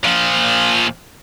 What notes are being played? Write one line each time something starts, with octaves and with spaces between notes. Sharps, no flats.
A#2 F3